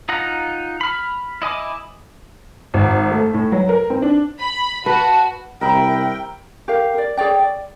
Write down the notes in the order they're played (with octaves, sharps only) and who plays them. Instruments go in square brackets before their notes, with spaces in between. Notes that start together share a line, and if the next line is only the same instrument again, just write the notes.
[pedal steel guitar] D#4 F4 F#5 A#5
B5 F6
E4 D#5 G#5 D6
[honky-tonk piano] G#1
A3
A2
F#3
A#4
C4
D4
[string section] B5
[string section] F#4 [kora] B4 [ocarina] A5
[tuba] C2 [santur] A#4 E5 B5 [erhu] G5
[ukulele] G4 A#4 F5
A#4 D5
G#4 C#5 D5 G5
D5